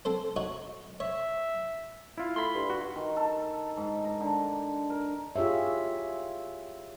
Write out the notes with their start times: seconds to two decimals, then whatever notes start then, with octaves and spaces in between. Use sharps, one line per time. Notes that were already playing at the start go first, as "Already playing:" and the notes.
0.05 C4 A4 C5
0.36 D#4 F#4 C#5
1.00 C#5 E5
2.18 E4 F4
2.36 A3 B5 C6
2.54 G2
2.70 F#4
2.96 D#3
3.17 A4
3.77 G#2
4.05 A#5
4.21 D3
4.90 A#4
5.36 F4 G4 G#4 C#5 E5